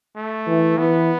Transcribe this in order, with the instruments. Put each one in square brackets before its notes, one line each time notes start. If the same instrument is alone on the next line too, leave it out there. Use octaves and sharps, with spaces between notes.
[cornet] A3
[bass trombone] E3
[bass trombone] E3 [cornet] B3